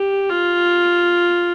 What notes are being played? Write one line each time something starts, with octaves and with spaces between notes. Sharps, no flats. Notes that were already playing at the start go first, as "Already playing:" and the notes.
Already playing: G4
F4